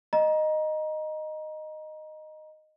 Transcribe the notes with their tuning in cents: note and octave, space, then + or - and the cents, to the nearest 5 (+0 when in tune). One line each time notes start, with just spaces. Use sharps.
D#5 -10 A#5 +25